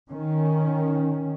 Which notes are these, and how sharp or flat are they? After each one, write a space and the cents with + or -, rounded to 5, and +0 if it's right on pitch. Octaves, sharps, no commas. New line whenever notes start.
D#3 +0 C#4 +0